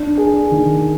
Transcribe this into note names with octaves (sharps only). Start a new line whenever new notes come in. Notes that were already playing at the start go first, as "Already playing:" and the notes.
Already playing: D4
G#4
D#3